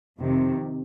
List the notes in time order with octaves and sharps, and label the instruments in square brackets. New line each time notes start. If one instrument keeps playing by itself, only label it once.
[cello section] F2 C3 D#3